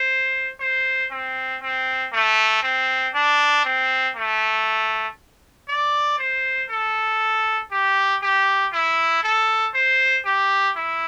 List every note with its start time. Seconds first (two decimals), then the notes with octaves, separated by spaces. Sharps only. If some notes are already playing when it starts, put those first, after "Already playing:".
Already playing: C5
0.60 C5
1.11 C4
1.62 C4
2.13 A3
2.63 C4
3.14 D4
3.65 C4
4.16 A3
5.68 D5
6.19 C5
6.70 A4
7.72 G4
8.22 G4
8.73 E4
9.23 A4
9.75 C5
10.25 G4
10.76 E4